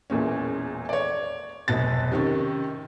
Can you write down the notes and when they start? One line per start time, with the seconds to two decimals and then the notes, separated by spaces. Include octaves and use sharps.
0.10 E1 E2 A#2 C#4
0.89 C#5 D5
1.68 F1 B1 B2 A6
2.12 C3 D#3 C#4